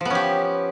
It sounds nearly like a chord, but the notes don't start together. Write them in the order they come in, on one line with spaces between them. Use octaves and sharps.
F3 B3 C#4 G4